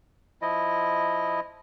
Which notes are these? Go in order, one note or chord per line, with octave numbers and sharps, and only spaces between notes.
F3 E4 D#5